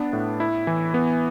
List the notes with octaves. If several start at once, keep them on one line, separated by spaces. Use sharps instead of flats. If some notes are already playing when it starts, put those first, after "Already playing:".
Already playing: B3 D4
A2
E4
E3
B3